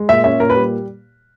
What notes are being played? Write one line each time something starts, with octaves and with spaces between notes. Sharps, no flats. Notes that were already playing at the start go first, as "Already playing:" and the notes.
Already playing: G#3
A#2 E5
C#4 E5
A#2 A#4
B4
G3